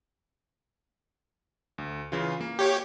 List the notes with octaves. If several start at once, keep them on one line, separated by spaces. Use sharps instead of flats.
D2
C#3 E3 F4
A#3
G4 C#5